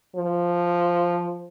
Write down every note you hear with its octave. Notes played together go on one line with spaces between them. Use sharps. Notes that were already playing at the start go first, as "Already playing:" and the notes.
F3